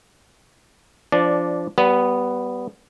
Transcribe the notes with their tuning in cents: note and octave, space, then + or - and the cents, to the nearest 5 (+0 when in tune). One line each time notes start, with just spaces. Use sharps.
F3 -15 D4 -15 D5 +0
G3 -25 B3 +0